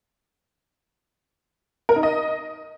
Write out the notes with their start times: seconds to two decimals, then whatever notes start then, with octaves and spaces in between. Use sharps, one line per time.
1.89 A#4
1.96 D#4
2.03 D#5